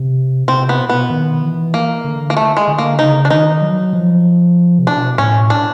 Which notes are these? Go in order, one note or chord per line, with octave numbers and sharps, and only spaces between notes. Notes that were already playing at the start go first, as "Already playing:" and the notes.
Already playing: C3
C3 C4
B3
B2
B3
D#3
E3
A#3
D3
A#3
A3
G#3
D3
A#3
C#3 D#4
D4
D#3 D#4
F#3
F3
C3
B2 D4
A2 C#4
D4